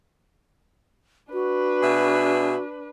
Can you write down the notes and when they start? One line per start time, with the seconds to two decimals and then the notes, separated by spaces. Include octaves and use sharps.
1.33 D4 F#4 B4
1.82 B2 G#4 E5